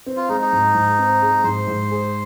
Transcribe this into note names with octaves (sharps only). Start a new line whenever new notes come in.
C4
F4
G#3 D#4
D#4
G#2
G#2
C4
G#3
G#2 C5
G#2
G#4